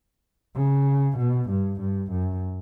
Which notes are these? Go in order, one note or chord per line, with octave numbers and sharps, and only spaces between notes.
C#3
B2
G2
G2
F#2